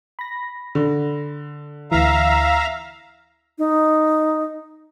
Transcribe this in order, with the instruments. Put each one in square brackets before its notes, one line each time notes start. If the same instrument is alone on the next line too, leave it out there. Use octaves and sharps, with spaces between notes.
[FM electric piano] B5 A#6
[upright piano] D3
[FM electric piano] D2 E3 [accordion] E5 F5 A#5
[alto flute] D#4